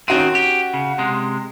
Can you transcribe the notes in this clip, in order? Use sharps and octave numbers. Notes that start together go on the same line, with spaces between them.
D#3 C4 C#4 F#4 D#7
G4
C#3
C3 G#3